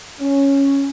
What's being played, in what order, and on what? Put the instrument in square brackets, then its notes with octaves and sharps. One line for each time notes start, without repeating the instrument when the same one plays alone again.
[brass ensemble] C#4